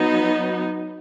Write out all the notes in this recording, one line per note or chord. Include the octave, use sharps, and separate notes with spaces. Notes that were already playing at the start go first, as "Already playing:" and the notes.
Already playing: F#3 B3 D#4